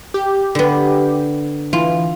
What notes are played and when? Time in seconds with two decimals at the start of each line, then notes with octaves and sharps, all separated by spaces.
0.14 G4
0.55 D3 B3
1.73 E3 F4